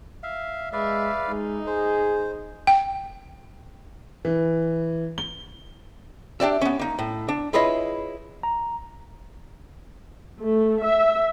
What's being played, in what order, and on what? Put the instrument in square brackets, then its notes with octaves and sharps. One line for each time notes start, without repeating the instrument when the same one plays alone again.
[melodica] E5 F5
[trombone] G#3 [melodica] B4 D5 F5 [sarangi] E5
[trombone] G#3 [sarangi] D#4
[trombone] G#4 [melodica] C5
[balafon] G5
[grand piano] E3
G7
[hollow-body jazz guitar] D4 G4 D5 E5
B3 C#4
A#3 D#4
A2
D4
E4 F4 G#4 B4 C#5 D#5
[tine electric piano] A#5
[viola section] A3
E5